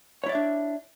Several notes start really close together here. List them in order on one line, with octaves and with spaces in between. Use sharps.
C#5 E4 D5 E5 D4